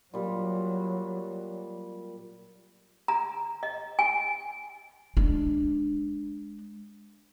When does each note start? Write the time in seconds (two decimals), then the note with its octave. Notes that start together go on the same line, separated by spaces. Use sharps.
0.14 A#2 F#3 G3
3.08 A#5
3.63 D#5
3.99 G#5
5.17 G#3 D4